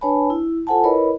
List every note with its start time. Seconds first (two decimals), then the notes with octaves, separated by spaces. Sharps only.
0.01 D4 B4 C#5 G#5 A5 B5
0.30 E4
0.67 F4 A4 C5 F#5 G#5 A5
0.84 E4 A#4 B4 C#5 D#5 B5